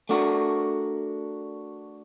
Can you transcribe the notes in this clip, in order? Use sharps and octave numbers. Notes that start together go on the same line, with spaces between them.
A3 D4 F#4 A#4